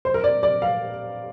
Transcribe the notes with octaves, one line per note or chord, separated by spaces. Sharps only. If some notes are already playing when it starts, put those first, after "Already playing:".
C5
A#4
D5
D5
F5